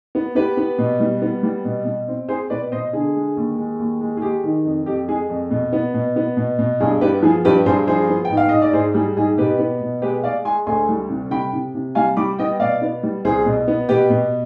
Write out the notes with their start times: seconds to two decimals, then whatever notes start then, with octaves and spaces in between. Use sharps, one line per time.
0.15 B3
0.35 B3 G4 B4
0.57 B3
0.78 B2
1.00 G3
1.22 B3
1.43 G3
1.65 B2
1.85 B2
2.08 C4
2.28 C4 G#4 C5
2.50 B2 B4 D5
2.72 B2 C5 D#5
2.93 D3 G#4
3.15 G#3
3.37 D#2
3.58 G#3
3.79 D#2
4.01 G#3
4.17 G#4
4.22 G#3 G4
4.44 D#3
4.65 F2
4.86 F2 G4
5.08 G#3 G#4
5.30 F2
5.51 B2
5.72 B3
5.94 B2
6.16 B3
6.37 B2
6.59 B2
6.80 G2 G#4
7.01 B3 G4 B4
7.23 F3 G#4
7.45 G2 G4 B4
7.66 G2 G#4 C5
7.87 F3 G#4 C5
8.09 B3
8.25 G5
8.30 G#2
8.37 F5
8.49 G#2 D#5
8.62 D5
8.73 G#2 G#4 C5
8.94 G3 G#4
9.17 G#2 G#4
9.38 B2 G4 B4
9.59 B3
9.81 B2
10.02 G#3 G4 B4
10.23 G#3 D5 F5
10.45 G#3 G#5 C6
10.67 D2 G#5 C6
10.89 G3
11.10 C3
11.31 C3 G5 B5
11.53 C3
11.75 C3
11.95 G3 F5 G#5
12.17 G3 B5 D6
12.39 B3 D#5 G5
12.60 B2 D5 F5
12.82 B3
13.03 G3
13.25 C2 G#4 C5
13.46 B2
13.68 B3
13.89 B2 G4 B4
14.10 B2